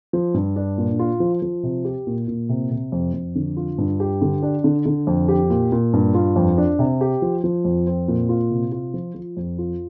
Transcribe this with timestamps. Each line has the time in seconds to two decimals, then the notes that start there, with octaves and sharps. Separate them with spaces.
0.13 F3
0.34 G2
0.56 D4
0.78 A#2
0.99 F4
1.20 F3
1.42 F3
1.63 C3
1.85 G4
2.07 A#2
2.28 A#2
2.49 C3
2.71 C3
2.92 F2
3.14 F2
3.35 D3
3.57 F4
3.78 G2
4.00 G4
4.22 D3
4.43 D4
4.64 D3
4.86 D3
5.07 F2
5.28 G4
5.50 A#2
5.72 A#2
5.93 G2
6.14 F4
6.36 F2
6.58 D4
6.79 C3
7.01 G4
7.22 F3
7.44 F3
7.65 F2
7.87 C4
8.08 A#2
8.29 F4
8.51 C3
8.72 F4
8.94 F3
9.15 F3
9.37 F2
9.59 F4